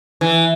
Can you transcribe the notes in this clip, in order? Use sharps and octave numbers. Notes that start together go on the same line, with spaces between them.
E3